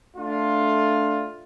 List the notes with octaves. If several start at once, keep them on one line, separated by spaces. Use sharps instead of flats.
A3 D4 F4